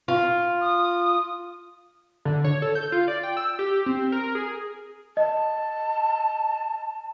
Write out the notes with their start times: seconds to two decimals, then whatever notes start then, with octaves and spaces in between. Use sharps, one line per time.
0.08 F4
0.61 D#6
2.25 D3
2.44 C#5
2.62 A4
2.75 G6
2.92 F4
3.08 D5
3.23 G5
3.37 E6
3.59 G4
3.86 C4
4.12 A#4
4.35 G#4
5.17 D#5 A5